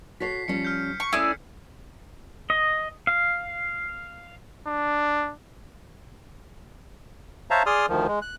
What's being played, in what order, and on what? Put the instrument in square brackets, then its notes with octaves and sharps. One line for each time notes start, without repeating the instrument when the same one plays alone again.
[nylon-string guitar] F#4 A4 C#5 [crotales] B6 C7
[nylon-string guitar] F3 G3 C#4 [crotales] C#7
[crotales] F6 G6
[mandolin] C#6
[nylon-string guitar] A3 C#4 [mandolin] E4 G#4 D5
[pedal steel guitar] D#5
F5
[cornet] D4
[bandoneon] C5 C#5 E5 F5 A5 A#5
G#4 D5 C6 D#6 F6
D2 D#3 F3
G#3
F#6